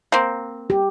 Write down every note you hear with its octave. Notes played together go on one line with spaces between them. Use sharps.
A#3 C4
G4